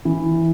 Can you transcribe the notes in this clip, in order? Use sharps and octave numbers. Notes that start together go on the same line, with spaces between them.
E3